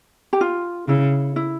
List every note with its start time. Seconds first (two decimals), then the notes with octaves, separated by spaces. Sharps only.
0.33 G4
0.41 F4
0.88 C#3 E4
1.36 E4